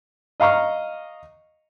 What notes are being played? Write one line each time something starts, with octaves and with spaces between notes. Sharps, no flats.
D#5 F5 A#5 C#6 F6